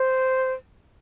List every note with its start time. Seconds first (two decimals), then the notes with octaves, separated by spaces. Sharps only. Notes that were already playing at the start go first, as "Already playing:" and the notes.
Already playing: C5